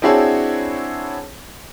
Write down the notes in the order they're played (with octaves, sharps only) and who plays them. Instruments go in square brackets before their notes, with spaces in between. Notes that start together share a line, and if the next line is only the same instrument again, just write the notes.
[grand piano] C4 D4 E4 F#4 G#4 C#5